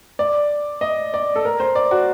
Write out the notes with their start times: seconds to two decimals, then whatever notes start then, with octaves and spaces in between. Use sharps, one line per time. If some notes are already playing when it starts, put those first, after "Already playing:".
0.19 D5
0.81 D#5
1.14 D5
1.36 A4
1.45 A#4
1.60 C5
1.75 D5
1.91 F#4